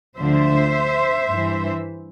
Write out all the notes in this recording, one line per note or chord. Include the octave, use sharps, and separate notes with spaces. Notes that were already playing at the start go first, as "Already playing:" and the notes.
D2 D3 F3 C5 E5
G2 E3